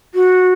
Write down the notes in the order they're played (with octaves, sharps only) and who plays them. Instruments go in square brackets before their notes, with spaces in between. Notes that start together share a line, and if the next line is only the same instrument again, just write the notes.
[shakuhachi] F#4